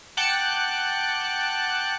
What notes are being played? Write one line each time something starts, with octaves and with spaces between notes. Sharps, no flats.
F#5 G5 A5 D6 F#6 C#7